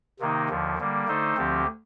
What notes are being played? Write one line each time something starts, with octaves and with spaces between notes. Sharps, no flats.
C3 D#3 A#3 D#4
D#2 D3 F3
D3 G3 A#3
D3 A3 D#4 A4 C5
D2 D3 F3 C4 G4